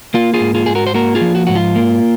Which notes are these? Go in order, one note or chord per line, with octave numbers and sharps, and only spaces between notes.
A#3 F4
F4 G#4
G#2
F4 G#4
G#2 G#4
F#4 A#4
C5
A#3 F#4 A#4
F4 G#4
F3
F#4
G#2 F#4
F4
A#3